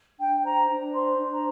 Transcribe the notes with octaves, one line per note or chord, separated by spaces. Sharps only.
D4 G5
C5 A#5
D4
C5 C6
D4
A#5